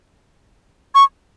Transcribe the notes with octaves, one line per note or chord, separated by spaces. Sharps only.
C#6